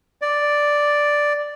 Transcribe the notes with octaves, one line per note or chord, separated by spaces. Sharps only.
D5